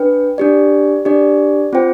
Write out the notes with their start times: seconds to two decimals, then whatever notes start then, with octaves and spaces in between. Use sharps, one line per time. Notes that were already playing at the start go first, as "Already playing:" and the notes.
Already playing: D4 B4 G5
0.38 D4 G4 D5
1.05 D4 G4 D5
1.73 C4 F4 C5 G5